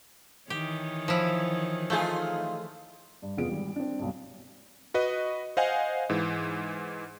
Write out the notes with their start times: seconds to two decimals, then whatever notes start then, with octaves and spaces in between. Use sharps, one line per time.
0.50 D#3 E3 G4 C#5
1.08 F3 E4
1.90 A3 D#4 F4 G#4
3.22 G2
3.37 F1 B3 F4 G#4 D7
3.49 G#1 G3
3.76 C4 D4
3.99 B1 G2
4.94 F#4 B4 D#5
5.57 C5 D#5 F5 F#5 G#5
6.09 G#2 E3